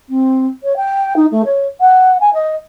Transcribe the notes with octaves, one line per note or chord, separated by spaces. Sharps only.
C4
C#5
G5
D#4
A3
C#5
F#5
G#5
D#5